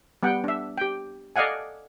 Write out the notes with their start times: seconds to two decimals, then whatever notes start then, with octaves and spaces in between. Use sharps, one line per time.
0.23 G3 B3 F#5 G5
0.44 D4 E5
0.78 G4 G5
1.36 A4 D5 D#5 F5 F#5 G#5